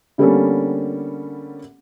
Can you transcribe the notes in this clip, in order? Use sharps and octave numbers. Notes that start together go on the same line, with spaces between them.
D3 G3 A#3 B3 C#4 A4